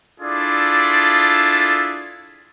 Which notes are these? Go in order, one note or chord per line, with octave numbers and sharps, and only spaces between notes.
D4 E4 F4 G#4 A4 D5